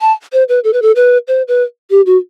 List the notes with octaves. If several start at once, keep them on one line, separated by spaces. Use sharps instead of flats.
A5
C5
B4
A4
B4
A4
B4
C5
B4
G4
F#4